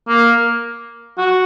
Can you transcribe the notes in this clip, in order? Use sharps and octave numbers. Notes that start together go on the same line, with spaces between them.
A#3
F#4